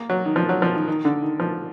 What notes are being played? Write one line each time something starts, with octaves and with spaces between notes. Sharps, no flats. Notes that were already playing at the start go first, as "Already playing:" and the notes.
Already playing: A#3
F#3
D#3
F3
F#3
F3
D#3
D#3
D3
D#3
F3